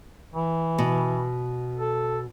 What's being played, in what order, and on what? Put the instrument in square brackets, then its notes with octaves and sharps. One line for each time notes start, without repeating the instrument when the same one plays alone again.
[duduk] E3
[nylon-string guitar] B2
[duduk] A4